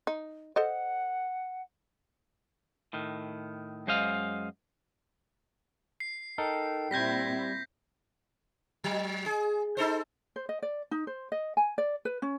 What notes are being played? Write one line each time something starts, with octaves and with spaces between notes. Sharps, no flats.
D#4
A4 C5 D#5 F#5
A2 D#3
F#2 G#3 C5 D#5 F5
C7
D#4 A4 A#4 G5
A#2 G3 C4 E4 G6 G#6 A#6 B6
F#3
G#4
D#4 A4 C5
C5
D#5
D5
D#4
C5
D#5
G#5
D5
B4
C#4